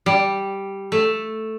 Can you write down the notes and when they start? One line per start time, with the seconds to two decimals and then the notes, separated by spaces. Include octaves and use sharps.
0.06 G3
0.92 A3